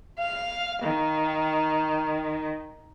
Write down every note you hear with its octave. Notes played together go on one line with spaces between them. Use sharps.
F5
D#3